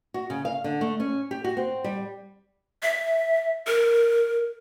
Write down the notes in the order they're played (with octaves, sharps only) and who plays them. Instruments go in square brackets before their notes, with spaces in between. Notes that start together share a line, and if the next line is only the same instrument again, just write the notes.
[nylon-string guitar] F#4
C#3
F5
D3
A3
C#4
G4
F#4
C4
G3
[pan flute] E5
A#4